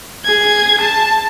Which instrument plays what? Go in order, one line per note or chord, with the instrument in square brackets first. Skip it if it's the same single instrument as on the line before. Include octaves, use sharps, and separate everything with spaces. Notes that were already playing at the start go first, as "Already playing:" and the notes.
[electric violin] G#4 G#6
A5